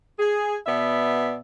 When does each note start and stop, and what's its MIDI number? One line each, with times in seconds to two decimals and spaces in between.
0.19 0.56 68
0.66 1.38 47
0.66 1.38 59
0.66 1.38 74
0.66 1.38 76